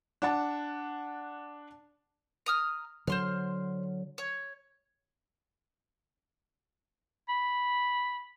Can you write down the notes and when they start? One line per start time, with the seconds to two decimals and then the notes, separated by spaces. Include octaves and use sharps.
0.22 D4 F#5 A5
2.46 A#5 D#6 F6
3.07 D3 F#3 C5 C6 F6
4.18 C#5
7.29 B5